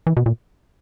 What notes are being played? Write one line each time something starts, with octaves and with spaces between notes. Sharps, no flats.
E3
B2
A#2